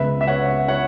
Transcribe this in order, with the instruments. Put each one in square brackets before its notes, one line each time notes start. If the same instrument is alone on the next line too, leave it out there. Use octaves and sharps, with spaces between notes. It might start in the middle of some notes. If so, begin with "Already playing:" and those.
Already playing: [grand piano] C#2 C#3 G#3 B3 [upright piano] B4 E5
[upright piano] E5
C#5 F#5
C#5 F#5